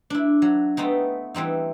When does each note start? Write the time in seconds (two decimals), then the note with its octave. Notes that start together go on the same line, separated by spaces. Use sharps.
0.10 D4 E4
0.42 F#3
0.77 A3 B3 C4 D#4
1.34 E3 G3 C4 D#4